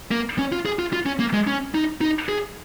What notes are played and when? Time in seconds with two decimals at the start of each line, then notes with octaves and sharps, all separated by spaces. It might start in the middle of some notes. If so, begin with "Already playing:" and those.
0.11 A#3
0.39 C#4
0.52 F4
0.65 G#4
0.79 F4
0.93 F4
1.06 C#4
1.19 A#3
1.34 G#3
1.47 C#4
1.75 D#4
2.01 D#4
2.29 G#4